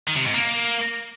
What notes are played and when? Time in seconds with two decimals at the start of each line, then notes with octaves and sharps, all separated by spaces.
0.07 D#3
0.16 C3
0.25 G#2
0.34 A#3